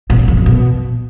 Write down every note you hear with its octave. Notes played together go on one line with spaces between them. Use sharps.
B2
C#3
F2
F#2
B2